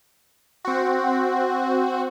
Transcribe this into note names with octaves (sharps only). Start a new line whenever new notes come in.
C4 F#4